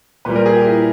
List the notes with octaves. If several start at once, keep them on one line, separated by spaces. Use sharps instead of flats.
A#2 G3 B4
A#4
G#4
G4
E4